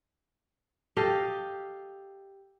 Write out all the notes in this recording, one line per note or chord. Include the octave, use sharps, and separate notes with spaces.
G4 A4 D#5 F5